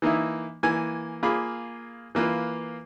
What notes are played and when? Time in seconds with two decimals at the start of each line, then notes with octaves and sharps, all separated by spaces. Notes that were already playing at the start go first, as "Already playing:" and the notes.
0.02 E3 A#3 D#4 E4
0.63 E3 A#3 G#5
1.23 A#3 F4 G#4 B5 D6
2.15 E3 A#3 F4 B4